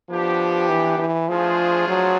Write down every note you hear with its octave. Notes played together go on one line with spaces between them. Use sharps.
F3 B3 D4 G4
E3
E3
F3 A3 D4 F4 G#4 C5
F#3